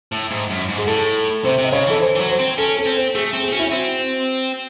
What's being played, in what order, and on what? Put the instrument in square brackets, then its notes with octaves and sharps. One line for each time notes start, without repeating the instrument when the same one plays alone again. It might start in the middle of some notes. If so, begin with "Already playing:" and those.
[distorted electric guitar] A2
G#2
F#2
G#2
[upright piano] G#4
[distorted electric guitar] A2 [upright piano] A4
[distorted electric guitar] C3 [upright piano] C5
[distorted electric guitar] C3
[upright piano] D#5
[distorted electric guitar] C#3 [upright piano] C#5
[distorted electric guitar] E3 [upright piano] A4
[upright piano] C5
[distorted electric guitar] E3
F#3
[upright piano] C5
[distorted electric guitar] C4
[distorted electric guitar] C#4 [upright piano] A4
[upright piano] A4
[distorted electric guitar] C4
[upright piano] C5
[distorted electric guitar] A3 [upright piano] G#4
[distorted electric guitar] C4
[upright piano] G#4
[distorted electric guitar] C#4 [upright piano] F#4
[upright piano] E4
F#4
[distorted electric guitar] C4